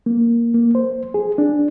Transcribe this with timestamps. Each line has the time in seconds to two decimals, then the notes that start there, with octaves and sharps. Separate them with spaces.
0.06 A#3
0.54 A#3
0.75 C5
1.14 G#4
1.38 D4